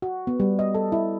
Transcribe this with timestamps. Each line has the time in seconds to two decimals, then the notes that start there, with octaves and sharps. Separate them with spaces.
0.02 F#4
0.27 B3
0.40 G3
0.59 D#5
0.74 A4
0.92 E4